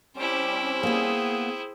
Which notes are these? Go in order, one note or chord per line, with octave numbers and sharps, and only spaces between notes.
G3 C4 C#4 E4 G4 C5 D6
A#3 B3 G#4 G5 D#6